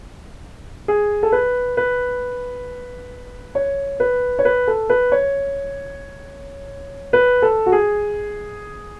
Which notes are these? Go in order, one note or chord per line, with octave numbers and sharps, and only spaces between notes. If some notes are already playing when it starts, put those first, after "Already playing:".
G#4
A4
B4
B4
C#5
B4
C#5
B4
A4
B4
C#5
B4
A4
F#4
G#4